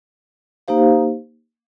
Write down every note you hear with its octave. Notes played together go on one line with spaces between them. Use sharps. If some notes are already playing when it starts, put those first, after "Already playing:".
A#3 D#4 G4 C5 F5